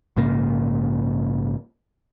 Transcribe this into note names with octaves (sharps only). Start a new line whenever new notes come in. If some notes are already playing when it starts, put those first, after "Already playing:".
A#1 G#2 C#3 A#3